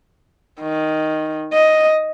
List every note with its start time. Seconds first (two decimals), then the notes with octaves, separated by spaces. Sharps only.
0.61 D#3
1.54 D#5